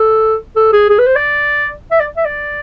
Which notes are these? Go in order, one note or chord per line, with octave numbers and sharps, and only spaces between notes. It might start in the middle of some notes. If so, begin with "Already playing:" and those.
Already playing: A4
A4
G#4
G#4
B4
C5
D5
E5
D5
E5
D5